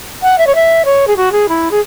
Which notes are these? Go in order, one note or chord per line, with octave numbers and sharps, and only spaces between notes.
F#5
E5
C#5
E5
C#5
G#4
F#4
G#4
E4
G#4